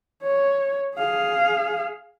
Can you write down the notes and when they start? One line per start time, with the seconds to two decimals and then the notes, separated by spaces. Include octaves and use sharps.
0.23 C#5
0.97 G#4 F5